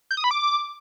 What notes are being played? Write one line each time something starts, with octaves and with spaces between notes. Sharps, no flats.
G6
D#6
B5
D6